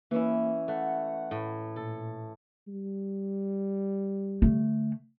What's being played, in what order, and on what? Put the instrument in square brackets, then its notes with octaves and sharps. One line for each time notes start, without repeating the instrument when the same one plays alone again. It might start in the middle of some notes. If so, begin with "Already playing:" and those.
[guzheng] E3 C#4 E4 [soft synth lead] A#3
[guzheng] A3 [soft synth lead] F#5
[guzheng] A2
[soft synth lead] A#2 [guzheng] A4
[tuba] G3
[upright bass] D3 A3